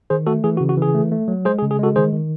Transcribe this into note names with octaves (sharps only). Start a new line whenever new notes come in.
D#3 G#4 C5
A3 F#4 A4
E3 G#4
F#4
C#3
F#4
E3 G#4
A3
A3
F#3
G#3 G#4 C5
G#4
C#3
G#4
G#3 F#4 A4
D#3 G#4 C5
D#3